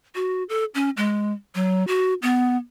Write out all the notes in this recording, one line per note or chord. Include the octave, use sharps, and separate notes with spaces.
F#4
A4
C#4
G#3
F#3
F#4
B3